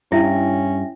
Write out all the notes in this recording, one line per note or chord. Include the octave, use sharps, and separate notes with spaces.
G2 C#4 E4 E5 G5 A#6